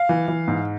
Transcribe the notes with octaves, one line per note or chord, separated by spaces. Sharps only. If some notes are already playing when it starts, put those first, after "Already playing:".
Already playing: F5
E3
E3
G#2